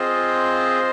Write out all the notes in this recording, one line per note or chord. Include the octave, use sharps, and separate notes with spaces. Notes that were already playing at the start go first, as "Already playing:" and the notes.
Already playing: C4 F4 G#4 C5 D#5